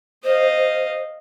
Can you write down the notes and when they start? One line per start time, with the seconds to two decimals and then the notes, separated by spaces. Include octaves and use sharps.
0.24 C5 D#5 F5